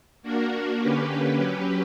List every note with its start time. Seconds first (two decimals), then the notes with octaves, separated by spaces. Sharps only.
0.22 A#3 D4 F#4 A#4
0.80 D3 A#3 C#4 G4 B4
1.36 F#3 C#4 G4 B4